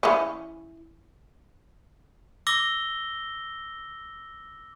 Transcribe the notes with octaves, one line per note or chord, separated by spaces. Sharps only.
E3 C#4
D6 E6 A#6 G7